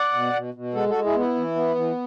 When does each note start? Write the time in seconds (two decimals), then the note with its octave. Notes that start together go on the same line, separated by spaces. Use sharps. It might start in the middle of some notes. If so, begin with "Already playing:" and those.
Already playing: D5 F#5
0.13 B2
0.33 B2
0.54 B2
0.74 G#3 F#4 A4
0.89 G#3 F#4 A4
1.04 E4 G#4
1.15 B3 E4
1.35 E3
1.55 B3
1.75 E3